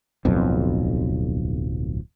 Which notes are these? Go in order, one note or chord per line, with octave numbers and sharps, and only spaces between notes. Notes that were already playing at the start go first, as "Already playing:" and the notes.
D1 B1 F2